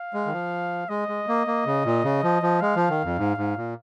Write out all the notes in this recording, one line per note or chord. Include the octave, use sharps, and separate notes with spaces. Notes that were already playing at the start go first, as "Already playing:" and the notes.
Already playing: F5
G#3
D#3
F3
G#3 D#5
G#3
A#3
A#3
C#3
A#2
C#3
F3
F3
G#3 F5
F3
D#3
F2
G#2
G#2
A#2